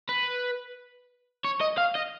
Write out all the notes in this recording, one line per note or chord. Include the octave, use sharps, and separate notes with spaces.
B4
C#5
D#5
F5
D#5